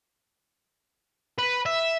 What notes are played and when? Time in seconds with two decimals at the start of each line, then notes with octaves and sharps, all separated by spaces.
1.39 B4
1.66 E5